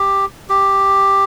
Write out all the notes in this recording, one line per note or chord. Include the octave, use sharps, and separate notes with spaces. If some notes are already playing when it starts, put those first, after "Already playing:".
Already playing: G4
G4